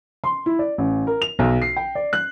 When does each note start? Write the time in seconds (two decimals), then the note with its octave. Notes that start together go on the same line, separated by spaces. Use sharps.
0.24 C6
0.46 E4
0.59 D5
0.78 A1
1.07 A#4
1.22 F7
1.39 B1
1.62 C7
1.77 G5
1.95 D5
2.13 F#6